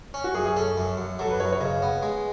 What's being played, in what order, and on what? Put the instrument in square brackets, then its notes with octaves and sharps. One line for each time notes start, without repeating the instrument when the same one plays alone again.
[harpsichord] C#4
[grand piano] F#4
[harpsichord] F#2 [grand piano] G#4
[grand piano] G#4
[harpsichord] C#4 [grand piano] A4
[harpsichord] F#2
F#2
[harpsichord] F#3 [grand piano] A4
[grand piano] B4
[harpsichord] F#2 [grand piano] C#5
[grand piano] C#5
[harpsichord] C#3 [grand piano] D#5
[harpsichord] B3
G#3